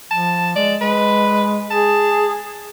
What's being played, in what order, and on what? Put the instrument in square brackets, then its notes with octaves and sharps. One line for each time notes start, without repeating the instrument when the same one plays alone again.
[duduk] F3 [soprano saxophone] A5
[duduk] G#3 [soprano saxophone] D5
[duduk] G#3 [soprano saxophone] B4
[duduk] G#4 [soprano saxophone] A5